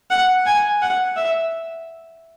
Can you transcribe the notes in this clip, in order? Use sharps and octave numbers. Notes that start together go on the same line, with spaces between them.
F#5
G#5
F#5
E5